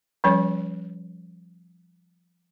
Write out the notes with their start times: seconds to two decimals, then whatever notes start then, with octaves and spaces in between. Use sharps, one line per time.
0.24 F3 G3 C#4 C#5